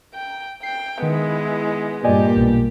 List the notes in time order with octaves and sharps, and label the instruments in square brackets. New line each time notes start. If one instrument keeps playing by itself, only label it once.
[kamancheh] G5
[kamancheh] G5 [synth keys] C7
[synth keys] D#3 [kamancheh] G#3 B3 [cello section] E4
[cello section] G2 [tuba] A#2 [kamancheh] G4 [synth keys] D5 D#5 G#5
[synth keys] B1 B2